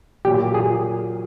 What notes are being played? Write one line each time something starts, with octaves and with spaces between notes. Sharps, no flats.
A#2 F#3 A#3 G4
G#4